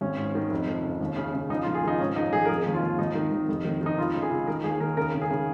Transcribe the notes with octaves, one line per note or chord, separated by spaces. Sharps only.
G#1 C#4
G#2
D#3
F1
F2
C#3
D#2
C#3
C#3
A#1 D#4
F4
A#1
G#4
D#3 D#4
G#2 C#4
A#1 D#4
D#3 G#4
A#4
F1 G#4
D#2
F4
D#2
G#1 D#4
D#3
G#1
F1
D#3
D#3 D#4
C#2 F4
C#3
G#4
C#2
D#3 A#4
D#2 G#4
D#3 A#4
C#3 A#4
C#3
G#4
C#3